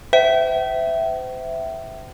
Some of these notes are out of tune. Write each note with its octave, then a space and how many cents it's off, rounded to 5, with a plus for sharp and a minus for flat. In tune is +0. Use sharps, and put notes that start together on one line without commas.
C5 -35 E5 +0 G5 -40